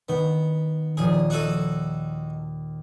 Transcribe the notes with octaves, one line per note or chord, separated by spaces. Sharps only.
D#3 B3
D#2 A#2 F3 G#4
D#4 F#4 A4 F#6 D#7